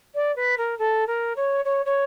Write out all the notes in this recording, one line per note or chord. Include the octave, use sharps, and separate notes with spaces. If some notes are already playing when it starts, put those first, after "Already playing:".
D5
B4
A#4
A4
A#4
C#5
C#5
C#5